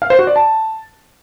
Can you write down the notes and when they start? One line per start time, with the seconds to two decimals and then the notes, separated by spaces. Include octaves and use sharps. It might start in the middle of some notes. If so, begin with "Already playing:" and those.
0.02 F5
0.10 C5
0.19 F#4
0.27 D5
0.36 A5